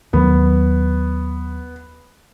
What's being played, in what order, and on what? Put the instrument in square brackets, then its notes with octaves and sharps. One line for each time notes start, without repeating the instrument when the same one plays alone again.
[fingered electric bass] D#2 D#3 F#3 [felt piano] B3